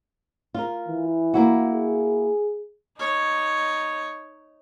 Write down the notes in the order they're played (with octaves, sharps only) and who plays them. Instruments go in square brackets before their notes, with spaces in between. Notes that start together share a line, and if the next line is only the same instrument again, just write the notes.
[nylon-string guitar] F4 A#4
[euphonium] E3
[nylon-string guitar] A#3 E4 F#4
[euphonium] G#4
[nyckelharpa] D#4 C#5